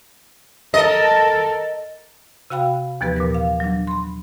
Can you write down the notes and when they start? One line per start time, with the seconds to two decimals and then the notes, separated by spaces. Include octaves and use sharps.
0.74 A4 A#4 D#5
2.50 C3 F#4 F5 G5 B5
3.01 D#2 E3 F3 B3 G4 B4
3.16 A#2 A#4 B4
3.34 F5
3.60 F#3 D4
3.87 B5 C6